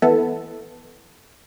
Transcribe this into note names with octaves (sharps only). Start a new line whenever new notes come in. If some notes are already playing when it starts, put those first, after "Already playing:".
E3 B3 A4